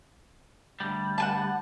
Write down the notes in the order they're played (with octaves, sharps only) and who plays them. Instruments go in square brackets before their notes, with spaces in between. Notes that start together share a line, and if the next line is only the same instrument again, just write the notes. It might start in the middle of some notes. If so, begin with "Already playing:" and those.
[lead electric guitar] D2 G3
[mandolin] F#5 G#5 A5